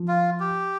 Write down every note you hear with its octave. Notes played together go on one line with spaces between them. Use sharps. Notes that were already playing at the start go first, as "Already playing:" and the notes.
Already playing: F3
F4
G4